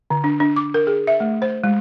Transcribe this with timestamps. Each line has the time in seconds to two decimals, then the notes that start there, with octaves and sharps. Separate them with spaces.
0.10 D3
0.24 D4
0.40 D4
0.56 D6
0.74 A#4
0.87 G#4
1.07 E5
1.20 A3
1.42 C5
1.64 G#3